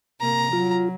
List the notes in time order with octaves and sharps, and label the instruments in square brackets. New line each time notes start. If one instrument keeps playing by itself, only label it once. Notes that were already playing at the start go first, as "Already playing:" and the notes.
[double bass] C3 A#3 [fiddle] A#5
[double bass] F#3 [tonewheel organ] F4